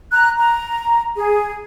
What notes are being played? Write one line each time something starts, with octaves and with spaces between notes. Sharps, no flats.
A#5 F#6
A#5
G#4